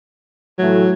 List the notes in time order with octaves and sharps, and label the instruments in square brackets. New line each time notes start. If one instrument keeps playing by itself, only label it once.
[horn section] A2 E3 A3 [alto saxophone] F#3